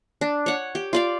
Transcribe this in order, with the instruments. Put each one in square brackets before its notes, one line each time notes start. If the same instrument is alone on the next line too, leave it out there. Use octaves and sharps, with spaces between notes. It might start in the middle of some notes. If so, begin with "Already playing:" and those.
[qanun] D4
C#5 F#5
G4
F4 D5 F5